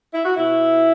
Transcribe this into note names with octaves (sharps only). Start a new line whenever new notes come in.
E4
F#4
B2 E4